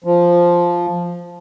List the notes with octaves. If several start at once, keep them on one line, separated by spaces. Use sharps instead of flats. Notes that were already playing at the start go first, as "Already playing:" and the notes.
F3